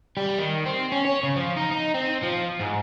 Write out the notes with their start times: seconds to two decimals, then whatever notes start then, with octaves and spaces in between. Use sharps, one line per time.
0.17 G3
0.38 D#3
0.66 C4
0.92 C#4
1.05 C#5
1.23 C#3
1.36 F3
1.57 D#4
1.71 D#4
1.94 C4
2.23 F3
2.61 G#2